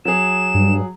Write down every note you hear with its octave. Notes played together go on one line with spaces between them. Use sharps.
F#3 G#4 E7
G2